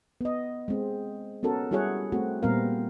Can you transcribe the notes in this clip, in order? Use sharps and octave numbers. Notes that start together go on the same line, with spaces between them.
B3 D#5
G#3 C4
B3 C#4 F#4 A4 A#4
G3 E4 F#4 G#4 C#5 F#5
A3 C4 F#4
A#2 G3 B3 C4 A#4 F5